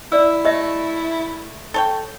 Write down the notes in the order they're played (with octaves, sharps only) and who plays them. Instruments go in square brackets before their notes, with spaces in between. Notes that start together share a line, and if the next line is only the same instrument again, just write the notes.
[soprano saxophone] E4 [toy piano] D5 E6
[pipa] A3 [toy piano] G4 D#5 E5
[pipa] A4 C#5 G5